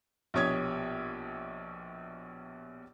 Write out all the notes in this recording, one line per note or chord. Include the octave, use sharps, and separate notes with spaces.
A#1 B2 G4 C#5 D#6 G#6